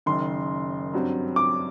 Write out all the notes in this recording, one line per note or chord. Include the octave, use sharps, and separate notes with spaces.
F#1 F#2 D#3 C6
G2 F#3 C4
D6